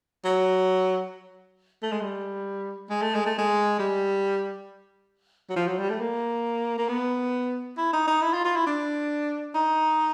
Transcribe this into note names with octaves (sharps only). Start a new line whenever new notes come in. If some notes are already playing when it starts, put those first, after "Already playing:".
F#3
A3
G#3
G3
G#3
A3
G#3
A3
G#3
G3
F#3
F3
F#3
G3
A3
A#3
A#3
B3
E4
D#4
D#4
E4
F4
F4
E4
D4
D#4